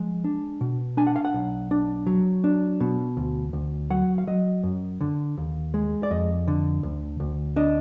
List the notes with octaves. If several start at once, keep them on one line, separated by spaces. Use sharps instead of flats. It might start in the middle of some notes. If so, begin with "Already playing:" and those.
Already playing: F3 G#3
D4
B2
D4 G#5
F#5
F5
F#5
B1
D4
F#3
D4
B2
D2
D2
F#3 F#5
F5
F#3 D#5
F#2
D3
D#2
G#3
D5
F2 D#5
D3
D2
D2
D4 D#5